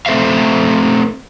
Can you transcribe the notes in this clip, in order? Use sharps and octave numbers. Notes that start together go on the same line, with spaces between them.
A3 C4 A4 C5 E5 F5